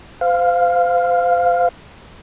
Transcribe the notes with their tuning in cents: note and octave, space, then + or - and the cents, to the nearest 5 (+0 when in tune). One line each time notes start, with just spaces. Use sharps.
C5 -35 F5 +0